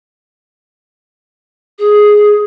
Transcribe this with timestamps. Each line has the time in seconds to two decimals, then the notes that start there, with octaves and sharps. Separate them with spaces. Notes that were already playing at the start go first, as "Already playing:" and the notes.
1.79 G#4